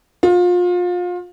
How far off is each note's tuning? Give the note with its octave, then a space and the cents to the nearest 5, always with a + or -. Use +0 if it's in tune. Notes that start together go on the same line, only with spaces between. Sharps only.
F4 +30